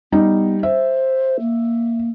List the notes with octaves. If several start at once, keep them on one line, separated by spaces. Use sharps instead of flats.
G3 B3 D#4
C5 E5
A#3